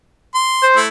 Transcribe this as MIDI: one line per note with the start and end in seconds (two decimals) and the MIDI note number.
0.35 0.67 84
0.63 0.79 72
0.76 0.88 57
0.76 0.88 64